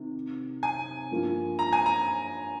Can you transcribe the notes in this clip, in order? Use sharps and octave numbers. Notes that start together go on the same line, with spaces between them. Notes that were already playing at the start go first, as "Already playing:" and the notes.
Already playing: C3 D#3
G#5
G2 F3 A#3 F4
A#5
G#5
A#5